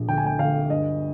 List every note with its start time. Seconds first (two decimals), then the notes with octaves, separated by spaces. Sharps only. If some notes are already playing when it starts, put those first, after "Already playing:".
Already playing: A#1
0.08 D2 G5
0.18 G#5
0.26 G5
0.39 D2 F5
0.70 G2 D#5